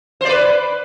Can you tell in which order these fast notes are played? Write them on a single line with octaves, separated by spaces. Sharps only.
C5 D5 B4